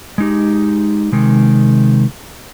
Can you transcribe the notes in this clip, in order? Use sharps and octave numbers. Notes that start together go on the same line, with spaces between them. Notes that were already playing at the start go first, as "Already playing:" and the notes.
G#3 D#4 G4
C3 D#3 G#3